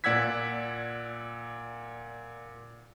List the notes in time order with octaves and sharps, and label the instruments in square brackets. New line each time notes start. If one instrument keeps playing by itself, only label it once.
[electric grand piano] A#2 D5 F#5 E6 G#6 B6